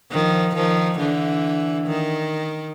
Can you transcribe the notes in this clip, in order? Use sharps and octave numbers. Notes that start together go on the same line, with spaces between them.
D#3 F3
D#3 F3
D3 E3
D#3